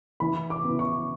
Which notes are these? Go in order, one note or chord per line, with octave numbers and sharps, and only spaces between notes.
E3 B5
D6
B3
E4
C#6